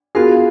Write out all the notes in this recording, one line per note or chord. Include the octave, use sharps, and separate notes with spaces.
B3 F4 F#4 G#4 A#4 F5